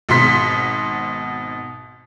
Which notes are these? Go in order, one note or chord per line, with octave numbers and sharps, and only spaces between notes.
G#1 B2 C6 B6